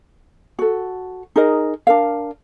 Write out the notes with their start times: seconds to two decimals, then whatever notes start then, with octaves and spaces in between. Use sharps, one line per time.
0.59 F#4 A4
1.36 D#4 G#4 A#4 D#5
1.87 D4 A#4 F5